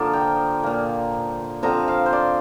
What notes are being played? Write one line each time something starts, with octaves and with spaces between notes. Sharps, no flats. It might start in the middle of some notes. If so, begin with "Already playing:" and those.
Already playing: D3 F3 A#3 A#4 D5
G5
A#2 A#3
D3 F3 C4 A#5
F5
C5
D5